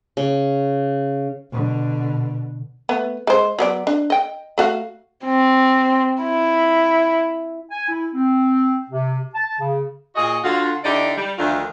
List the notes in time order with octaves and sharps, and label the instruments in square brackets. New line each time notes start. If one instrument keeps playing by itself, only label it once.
[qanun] C#3
[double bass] B2 D3
[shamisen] A3 B3
G#3 C5
F#3 B3 D5
D4
D#5 G5
A3 F#4 F5
[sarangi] C4
E4
[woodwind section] G#5
E4
C4
C3
A5
C#3
[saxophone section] A#2 F#4 G#4 D#5
D3 F4 F#4
D3 D#4 E4 G4 D5
G3
D2 D#3 F3 A3 D4 F4